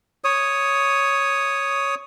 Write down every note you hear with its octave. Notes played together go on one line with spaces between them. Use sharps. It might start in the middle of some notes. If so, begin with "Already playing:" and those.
C#5 D#6